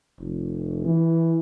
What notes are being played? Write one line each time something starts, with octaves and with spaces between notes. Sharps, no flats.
F1
E3